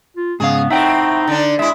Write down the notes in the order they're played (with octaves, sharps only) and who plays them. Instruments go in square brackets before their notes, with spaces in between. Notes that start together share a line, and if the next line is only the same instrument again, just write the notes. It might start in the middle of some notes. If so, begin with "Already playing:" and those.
[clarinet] F4
[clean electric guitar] G#2 C#3 F5 [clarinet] B3 [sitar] G#4
[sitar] A2 C4 [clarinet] D#4 [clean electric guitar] E5 F#5 G5
[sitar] D3 D4
[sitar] G#3 E4 [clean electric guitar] E5